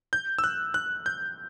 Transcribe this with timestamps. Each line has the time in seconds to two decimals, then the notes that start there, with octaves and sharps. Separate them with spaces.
0.13 G6
0.39 E6
0.44 F#6
0.74 F#6
1.06 G6